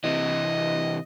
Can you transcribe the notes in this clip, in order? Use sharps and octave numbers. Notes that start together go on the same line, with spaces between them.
C3 E3 D#5